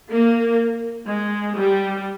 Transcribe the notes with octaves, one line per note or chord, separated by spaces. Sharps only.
A#3
G#3
G3